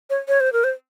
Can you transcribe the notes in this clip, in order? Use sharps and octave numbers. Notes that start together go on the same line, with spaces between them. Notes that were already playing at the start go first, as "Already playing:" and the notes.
C#5
C#5
C5
A#4
C5